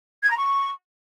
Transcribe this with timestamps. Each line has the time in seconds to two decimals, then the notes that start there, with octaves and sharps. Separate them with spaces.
0.23 G#6
0.29 A#5
0.36 C#6